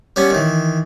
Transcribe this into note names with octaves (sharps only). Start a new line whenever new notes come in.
G3 B3 C#4
D#3 E3